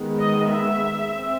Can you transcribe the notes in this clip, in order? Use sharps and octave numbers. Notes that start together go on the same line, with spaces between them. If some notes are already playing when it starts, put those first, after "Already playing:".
Already playing: D#3 G#3 B3
D#5
E5
C4